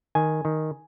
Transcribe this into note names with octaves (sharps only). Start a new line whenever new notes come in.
D#3 G#5
D#3